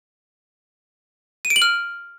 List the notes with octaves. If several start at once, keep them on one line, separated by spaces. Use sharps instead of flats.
D#7
D7
F#7
F6